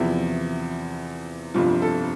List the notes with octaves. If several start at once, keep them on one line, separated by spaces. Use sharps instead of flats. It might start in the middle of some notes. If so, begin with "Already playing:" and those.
Already playing: E2 C3 F3 E4
G1 F2 C3 F3 F4
A4